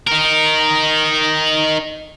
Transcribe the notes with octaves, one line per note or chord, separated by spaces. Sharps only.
D#4 A#4